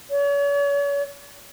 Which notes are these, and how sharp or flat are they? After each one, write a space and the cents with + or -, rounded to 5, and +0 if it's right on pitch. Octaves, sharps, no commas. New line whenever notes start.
C#5 +40